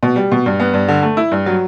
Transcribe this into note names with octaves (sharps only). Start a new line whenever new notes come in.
B2
G3
B2
G2
B3
G2
D3
A3
E4
G2
F#3